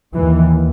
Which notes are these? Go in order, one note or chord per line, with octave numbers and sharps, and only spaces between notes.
D#2 E3